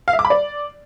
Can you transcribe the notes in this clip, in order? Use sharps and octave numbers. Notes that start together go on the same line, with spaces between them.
F5
E5
D6
B5
D5